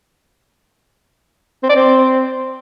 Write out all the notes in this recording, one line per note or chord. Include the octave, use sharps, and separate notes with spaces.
C4
D5
C4